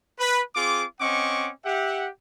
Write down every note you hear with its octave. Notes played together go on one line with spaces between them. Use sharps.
B4 B5
C4 F4 G#4 D6
C4 C#4 D#5 F#5 C#6 D6
G4 E5 F#5